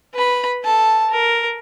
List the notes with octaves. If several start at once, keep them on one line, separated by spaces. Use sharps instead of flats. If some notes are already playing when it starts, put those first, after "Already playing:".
B4 B5
A4 A5
A#4